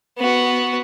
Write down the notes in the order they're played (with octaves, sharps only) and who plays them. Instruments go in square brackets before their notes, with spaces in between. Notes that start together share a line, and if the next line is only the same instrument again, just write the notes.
[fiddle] B3 F#4